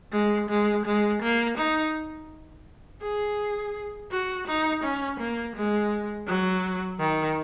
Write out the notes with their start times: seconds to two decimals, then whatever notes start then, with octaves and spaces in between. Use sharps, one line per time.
0.12 G#3
0.49 G#3
0.85 G#3
1.21 A#3
1.57 D#4
3.02 G#4
4.11 F#4
4.47 D#4
4.83 C#4
5.19 A#3
5.56 G#3
6.27 F#3
7.00 D#3